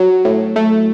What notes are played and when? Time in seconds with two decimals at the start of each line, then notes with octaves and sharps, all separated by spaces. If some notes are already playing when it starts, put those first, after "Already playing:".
Already playing: F#3
0.25 A2
0.56 A3